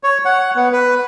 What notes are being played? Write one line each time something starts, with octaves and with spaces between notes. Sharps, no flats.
C#5
F#5
B3
B4